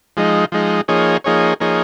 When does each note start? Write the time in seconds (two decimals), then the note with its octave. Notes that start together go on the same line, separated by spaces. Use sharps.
0.17 F3 G#3 D#4
0.52 F3 G#3 D#4
0.88 F3 A#3 D#4 G#4 C#5
1.24 F3 A#3 D#4 G#4 C#5
1.60 F3 A#3 D#4 G#4 C#5